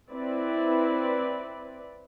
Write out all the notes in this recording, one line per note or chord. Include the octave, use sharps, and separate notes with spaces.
C4 E4 B4 D5